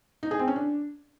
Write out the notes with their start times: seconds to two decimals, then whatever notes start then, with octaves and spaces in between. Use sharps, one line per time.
0.23 D#4
0.31 G#4
0.39 C4
0.48 C#4
0.56 D4